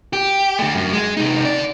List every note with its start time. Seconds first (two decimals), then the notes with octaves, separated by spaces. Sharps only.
0.13 G4
0.59 D3 A3
0.75 F#2
0.93 G#3
1.17 C3 D#4
1.45 D3 D5